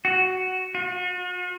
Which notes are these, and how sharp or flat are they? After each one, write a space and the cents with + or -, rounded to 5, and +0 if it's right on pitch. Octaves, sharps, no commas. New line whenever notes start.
F#4 +5
F#4 -45